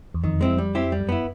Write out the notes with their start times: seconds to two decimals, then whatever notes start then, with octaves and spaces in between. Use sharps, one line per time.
0.14 E2
0.24 F2 D#3
0.41 G#3 C4 E4
0.58 G3
0.75 C4 E4 G4
0.92 G3
1.00 F#2
1.09 B3 E4